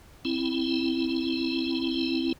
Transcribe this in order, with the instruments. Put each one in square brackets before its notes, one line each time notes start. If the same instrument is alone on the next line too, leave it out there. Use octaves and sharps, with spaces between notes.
[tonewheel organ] C4 E4